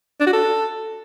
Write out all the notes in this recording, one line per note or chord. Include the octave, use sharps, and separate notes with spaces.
D4
F#4
A4